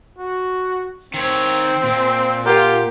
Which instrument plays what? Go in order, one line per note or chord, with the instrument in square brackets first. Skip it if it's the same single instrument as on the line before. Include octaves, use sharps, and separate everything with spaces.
[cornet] F#4
[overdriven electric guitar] D#3 C#5 [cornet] C4
[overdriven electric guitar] A#2
[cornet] F4 [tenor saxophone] G4 [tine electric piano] A#4 F#5